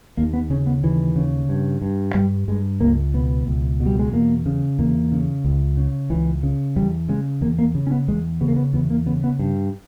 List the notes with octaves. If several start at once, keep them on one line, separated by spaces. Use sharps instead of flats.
D#2 A#3
B3
C#3 C#4
B3
D#2 E3
C#3
G2
G2
G2 G3
G2 G#3
C#2 A#3
B2 B3
C#2
B2
G3
G#3
E2 A#3
C#3
E2 A#3
C#3
C#2
C#3
C#2 E3
C#3
E2 G3
C#3 G#3
E2 A#3
A#3
C#3
C#4
B3
E2 G#3
C#3 B3
A#3
B3
E2 B3
A#3
C#3 B3
B3
G2